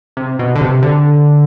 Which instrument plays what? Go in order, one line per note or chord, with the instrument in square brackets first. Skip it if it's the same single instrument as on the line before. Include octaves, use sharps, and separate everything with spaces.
[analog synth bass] C3
B2
D3
C3
D3